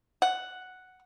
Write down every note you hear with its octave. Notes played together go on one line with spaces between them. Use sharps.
F#5